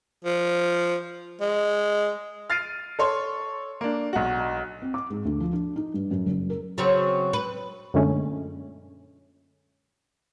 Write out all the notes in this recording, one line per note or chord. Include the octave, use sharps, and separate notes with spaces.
F3
G#3
F6 A6 C7 D7 D#7
A4 C#5 C6 C#6
A#3 D4
B1 F#4
C4
D6
G#2
D2
F3
D4
D#4
G2
F#2
F#1
A#4
C#3 F#3 C4
B4
F#2 A#2 D3 G#3 A3 C#4